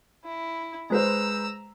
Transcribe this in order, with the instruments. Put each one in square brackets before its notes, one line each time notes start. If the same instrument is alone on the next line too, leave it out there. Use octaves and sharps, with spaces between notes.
[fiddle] E4
[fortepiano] G#3 B4 C5 [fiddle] A#5 E6